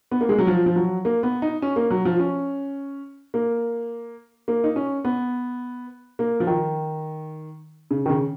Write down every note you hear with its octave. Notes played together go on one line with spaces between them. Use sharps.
B3
A#3
G#3
F#3
F3
F3
F#3
A#3
B3
D#4
C#4
A#3
F#3
F3
C#4
A#3
A#3
D#4
C#4
B3
A#3
F3
D#3
C#3
D#3
C#3